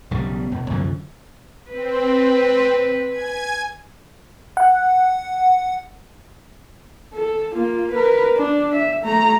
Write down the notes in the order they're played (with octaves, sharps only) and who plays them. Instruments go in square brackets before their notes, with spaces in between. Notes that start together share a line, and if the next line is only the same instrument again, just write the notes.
[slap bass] E1 B1 C#3 G3
E1
C2 F#2 D3 F3
[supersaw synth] C4 [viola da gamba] B4
[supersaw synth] G#5 G#6
[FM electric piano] F#5
[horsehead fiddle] A4
A#3 F4
A#4 B4
D4
E5
A3 A#5